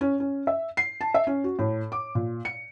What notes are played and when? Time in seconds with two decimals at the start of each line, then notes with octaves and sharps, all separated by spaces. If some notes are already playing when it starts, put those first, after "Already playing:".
0.01 C#4
0.20 C#4
0.47 E5
0.77 C7
1.01 A5
1.14 E5
1.27 C#4
1.44 F#4
1.59 A2
1.92 D6
2.15 A#2
2.45 C#7